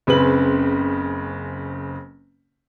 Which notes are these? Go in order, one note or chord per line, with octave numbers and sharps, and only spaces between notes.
F#1 C#3 C4 B4 F#7